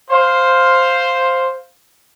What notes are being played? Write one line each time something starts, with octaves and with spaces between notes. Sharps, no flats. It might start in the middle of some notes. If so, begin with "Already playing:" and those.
C5 F5